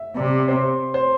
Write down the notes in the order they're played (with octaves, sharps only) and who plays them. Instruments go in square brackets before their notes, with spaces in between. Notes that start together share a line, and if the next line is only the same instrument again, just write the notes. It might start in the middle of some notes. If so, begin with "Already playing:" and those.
Already playing: [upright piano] E5
[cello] C3 [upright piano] D5
[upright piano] C5
C5